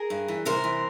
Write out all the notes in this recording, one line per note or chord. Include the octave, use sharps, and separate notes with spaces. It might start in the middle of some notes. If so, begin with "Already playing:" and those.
Already playing: G#4 A#4
G2
E3
C3 A#4 C5
E3